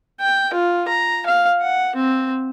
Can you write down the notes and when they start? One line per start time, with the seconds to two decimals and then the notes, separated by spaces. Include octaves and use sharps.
0.21 G5
0.53 F4
0.88 A#5
1.26 F5
1.61 F#5
1.95 C4